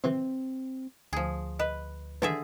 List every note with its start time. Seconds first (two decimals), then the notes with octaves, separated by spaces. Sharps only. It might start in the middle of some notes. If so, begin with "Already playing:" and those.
0.04 C3 E3 C4
1.13 D2 F3 G#4
1.59 B4 D#5
2.22 D#2 D3 E3 G#4 E5